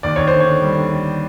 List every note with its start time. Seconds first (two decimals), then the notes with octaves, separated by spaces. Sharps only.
0.03 D#2 D5
0.16 D#2 C#5
0.27 C5
0.33 D3
0.40 C#5
0.47 D3
0.62 G3
0.77 D3
0.91 D3